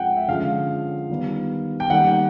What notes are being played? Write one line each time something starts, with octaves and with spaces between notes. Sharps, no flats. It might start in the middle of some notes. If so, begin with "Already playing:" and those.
Already playing: F3 G#3 C4 F#5 G5
E5
D3 F3 G#3 C#4 F5
D#3 G3 B3
G5
D#3 G3 A#3 F#5